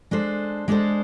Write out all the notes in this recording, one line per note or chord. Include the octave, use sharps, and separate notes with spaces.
G#3 D4 A4 C5
G#3 D4 A4 C5